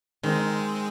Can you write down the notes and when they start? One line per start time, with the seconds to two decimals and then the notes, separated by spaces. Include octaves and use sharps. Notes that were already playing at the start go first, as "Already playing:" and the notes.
0.23 D#3 G#3 C4